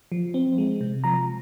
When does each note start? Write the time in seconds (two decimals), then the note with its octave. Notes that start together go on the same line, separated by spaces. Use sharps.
0.12 F3
0.34 C4
0.58 G#3
0.81 C3
1.04 F3 A#5